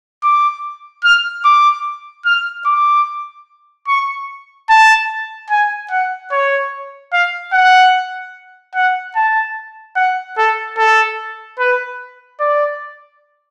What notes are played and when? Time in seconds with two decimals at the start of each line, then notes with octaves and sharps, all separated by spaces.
0.23 D6
1.04 F6
1.45 D6
2.26 F6
2.66 D6
3.88 C#6
4.69 A5
5.50 G#5
5.91 F#5
6.31 C#5
7.13 F5
7.53 F#5
8.75 F#5
9.16 A5
9.96 F#5
10.37 A4
10.78 A4
11.59 B4
12.40 D5